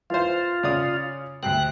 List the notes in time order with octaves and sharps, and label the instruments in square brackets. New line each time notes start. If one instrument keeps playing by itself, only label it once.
[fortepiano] E3 C5 [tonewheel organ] F4
[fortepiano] C#3 D5 D#6
[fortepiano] D2 C3 C4 [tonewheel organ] F#6